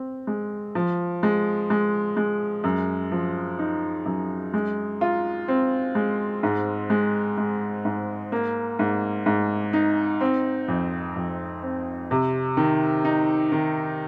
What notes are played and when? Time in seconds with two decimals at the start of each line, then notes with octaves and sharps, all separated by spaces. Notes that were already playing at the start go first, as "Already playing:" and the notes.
Already playing: C4
0.27 G#3
0.75 F3
1.23 G#3
1.70 G#3
2.17 G#3
2.64 F#2
3.12 F3
3.59 D#4
4.06 F#2
4.54 G#3
5.01 F4
5.48 C4
5.95 G#3
6.43 G#2
6.90 G#3
7.38 G#3
7.85 G#2
8.32 A#3
8.79 G#2
9.26 G#2
9.73 D#4
10.21 C4
10.68 F2
11.16 F2
11.63 C4
12.11 C3
12.57 D#3
13.05 D#4
13.52 D#3